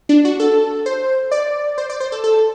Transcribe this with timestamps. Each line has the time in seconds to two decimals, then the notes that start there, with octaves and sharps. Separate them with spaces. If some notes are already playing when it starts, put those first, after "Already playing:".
0.09 D4
0.25 F#4
0.40 A4
0.86 C5
1.31 D5
1.78 C5
1.90 D5
2.00 C5
2.12 A4
2.24 A4